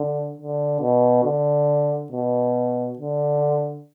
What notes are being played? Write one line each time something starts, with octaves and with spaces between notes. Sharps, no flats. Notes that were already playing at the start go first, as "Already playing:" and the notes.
Already playing: D3
D3
B2
D3
B2
D3